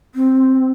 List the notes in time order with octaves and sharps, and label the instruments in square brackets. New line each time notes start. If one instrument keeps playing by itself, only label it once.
[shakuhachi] C4